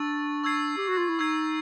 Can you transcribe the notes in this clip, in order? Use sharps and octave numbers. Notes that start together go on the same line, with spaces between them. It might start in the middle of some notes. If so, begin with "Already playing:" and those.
Already playing: D4 C#6 E6 A6
C#6 E6 G#6 C7
G4
F#4
F4
E4
D#4 C#6 E6 G#6 C7